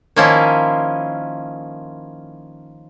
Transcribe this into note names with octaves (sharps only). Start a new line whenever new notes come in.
D#3 F3 A#3 C#4 E4 F4